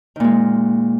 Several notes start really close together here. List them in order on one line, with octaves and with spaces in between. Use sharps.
D#3 A#2 G#3